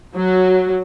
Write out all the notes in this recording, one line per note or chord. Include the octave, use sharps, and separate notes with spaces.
F#3